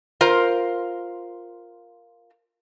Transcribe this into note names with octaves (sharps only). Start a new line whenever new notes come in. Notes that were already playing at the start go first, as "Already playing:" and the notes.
F4 A#4 C5